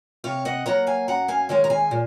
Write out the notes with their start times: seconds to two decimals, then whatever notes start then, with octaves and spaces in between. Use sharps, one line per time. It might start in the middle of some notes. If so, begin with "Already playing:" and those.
0.24 C3 C#5 F5
0.45 D#5 F#5
0.66 F#3 A#3 F#5 A#5
0.87 F5 G#5
1.08 F#2 F#5 A#5
1.28 F5 G#5
1.49 D#3 G#3 C#5 F5
1.64 A#5
1.70 F5 G#5
1.91 A#2